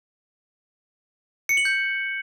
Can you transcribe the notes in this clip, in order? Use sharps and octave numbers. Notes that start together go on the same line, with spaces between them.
C#7
F#7
G6